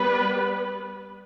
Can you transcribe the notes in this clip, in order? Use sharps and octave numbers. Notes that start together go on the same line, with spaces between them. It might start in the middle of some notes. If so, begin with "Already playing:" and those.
Already playing: G3 B3 B4